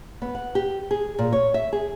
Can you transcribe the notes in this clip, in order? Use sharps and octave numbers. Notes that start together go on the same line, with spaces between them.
B3
F#5
G4
G#4
A#2
C#5
E5
G#4